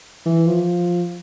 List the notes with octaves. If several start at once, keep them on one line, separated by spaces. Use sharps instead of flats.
E3
F3